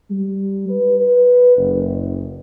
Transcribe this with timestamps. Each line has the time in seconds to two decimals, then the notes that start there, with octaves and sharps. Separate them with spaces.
0.11 G3
0.68 B4
1.00 B4
1.57 F#1